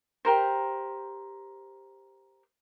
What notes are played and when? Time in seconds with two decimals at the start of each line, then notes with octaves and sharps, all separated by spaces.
0.25 G4 A#4 C5